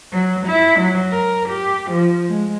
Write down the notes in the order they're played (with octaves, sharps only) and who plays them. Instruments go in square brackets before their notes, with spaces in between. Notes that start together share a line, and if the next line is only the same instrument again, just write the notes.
[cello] F#3
E4
F#3
A#4
G4
F3
G#3